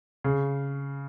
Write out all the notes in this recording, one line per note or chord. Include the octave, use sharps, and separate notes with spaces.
C#3